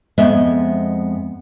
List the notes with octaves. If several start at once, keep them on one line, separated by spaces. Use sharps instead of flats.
F2 G#3 B3 D#5 E5